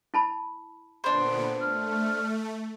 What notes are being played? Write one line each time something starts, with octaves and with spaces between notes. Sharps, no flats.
E4 A5 B5
A#2 D3 B3 D4 C5
A3 F6